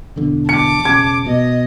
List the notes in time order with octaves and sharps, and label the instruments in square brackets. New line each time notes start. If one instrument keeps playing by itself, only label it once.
[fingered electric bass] E1 E2 D3
[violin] A5 D6 [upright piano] C#7
[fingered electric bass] E1 C#3 [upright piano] G#6
[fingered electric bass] B2 [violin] D#5